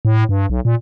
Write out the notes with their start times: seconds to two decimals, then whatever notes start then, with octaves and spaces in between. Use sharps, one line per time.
0.05 A2
0.29 G2
0.50 B1
0.65 A#2